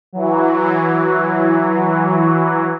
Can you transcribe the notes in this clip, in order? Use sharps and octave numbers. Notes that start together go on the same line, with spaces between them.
E3 F#3